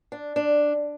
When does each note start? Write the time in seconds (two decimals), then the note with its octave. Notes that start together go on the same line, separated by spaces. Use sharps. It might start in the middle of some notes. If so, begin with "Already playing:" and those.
0.12 D4
0.36 D4